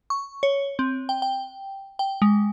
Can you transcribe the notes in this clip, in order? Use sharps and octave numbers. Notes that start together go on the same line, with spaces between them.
C#6
C#5
C4
G5
G5
G5
G#3